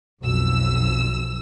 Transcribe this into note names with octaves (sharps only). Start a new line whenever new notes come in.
B1 F2 E6